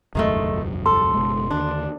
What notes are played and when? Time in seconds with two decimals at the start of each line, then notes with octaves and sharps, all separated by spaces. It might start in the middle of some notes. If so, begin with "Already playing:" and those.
0.15 E1 C#2 F#2 D#3 G#3 A3
0.86 A4 C6
1.14 F#1 B2 G#3
1.51 D#2 D3 D4